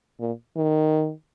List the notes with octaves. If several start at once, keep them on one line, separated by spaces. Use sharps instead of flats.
A#2
D#3